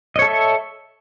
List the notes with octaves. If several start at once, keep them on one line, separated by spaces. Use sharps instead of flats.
A4 C#5 D#5 E5